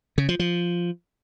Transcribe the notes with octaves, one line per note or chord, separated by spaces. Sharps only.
C#3
F3
F3